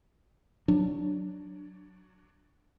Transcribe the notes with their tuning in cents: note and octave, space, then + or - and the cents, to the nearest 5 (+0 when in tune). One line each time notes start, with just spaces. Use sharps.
F#3 +0 D4 +0